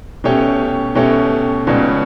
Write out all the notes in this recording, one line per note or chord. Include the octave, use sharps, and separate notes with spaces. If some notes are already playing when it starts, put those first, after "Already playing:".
B2 A3 C#4 G4
B2 A3 C#4 G4
C#2 B2 G3 C#4